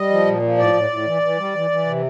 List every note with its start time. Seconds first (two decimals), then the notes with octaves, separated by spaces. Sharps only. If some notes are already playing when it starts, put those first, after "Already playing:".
Already playing: G3 D#5
0.10 F3
0.26 A#2
0.42 F3
0.57 A2 D5
0.73 A2
0.90 A2
1.06 E3
1.22 E3
1.38 G3
1.55 E3
1.71 E3
1.86 C3